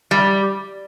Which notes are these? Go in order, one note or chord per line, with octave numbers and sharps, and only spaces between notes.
G3